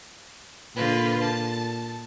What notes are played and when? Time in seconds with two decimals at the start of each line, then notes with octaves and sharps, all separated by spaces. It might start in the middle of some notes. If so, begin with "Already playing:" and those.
0.76 A#2 D3 F4 B4
1.22 A5